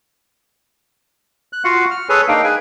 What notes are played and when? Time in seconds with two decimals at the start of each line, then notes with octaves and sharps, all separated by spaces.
1.53 F#6
1.64 F4 F#4 F5 F#5
1.91 F6
2.09 G#4 A4 B4 C#5 G#5
2.28 A#3 D4 D#4 F5 G5
2.44 G#4 B4 G#5